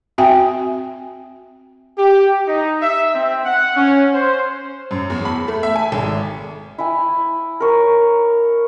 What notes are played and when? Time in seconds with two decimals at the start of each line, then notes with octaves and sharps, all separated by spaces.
0.18 C4 F#4 E5 G5 G#5
1.98 G4
2.48 D#4
2.82 E5
3.15 C4
3.45 F#5
3.77 C#4
4.14 C5
4.91 F#2
5.10 E2
5.25 B5
5.48 A3
5.63 E5
5.76 G#5
5.92 G#1
6.78 E4 G#5
7.60 A#4 C#5